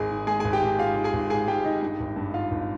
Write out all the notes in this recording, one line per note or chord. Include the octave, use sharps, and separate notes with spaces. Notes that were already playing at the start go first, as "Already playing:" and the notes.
Already playing: G#1 G#3 G#4 G#5
D#3
G#3 G#4 G#5
G#1 G#4 G#5
G4 G5
G#1
G#3 F4 F5
D#3
G#4 G#5
G#1
G#2 G#4 G#5
G#2 G4 G5
D#3 D#4 D#5
G2
G#1
G2
D#3 F4 F5
G#1